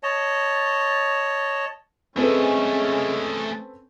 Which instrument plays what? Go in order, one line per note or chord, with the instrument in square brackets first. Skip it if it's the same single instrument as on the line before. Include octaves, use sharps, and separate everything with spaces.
[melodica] C#5 D#5 A5
[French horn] G#3 [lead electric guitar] A3 G#4 [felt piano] C4 A4 B4 [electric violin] C#4